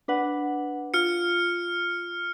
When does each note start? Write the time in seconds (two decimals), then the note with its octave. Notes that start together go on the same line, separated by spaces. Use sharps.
0.08 D4 B4 F#5
0.94 F4 F6 C#7